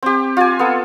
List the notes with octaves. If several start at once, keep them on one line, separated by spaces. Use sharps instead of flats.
C4 G4
F4 G#5
B3 A4